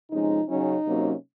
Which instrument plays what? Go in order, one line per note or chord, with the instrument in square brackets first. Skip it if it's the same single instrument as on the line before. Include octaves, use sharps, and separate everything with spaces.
[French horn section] C3 F3 G#3 C#4 D#4
C#3 F#3 C#4 D#4
C3 F#3 A#3 C#4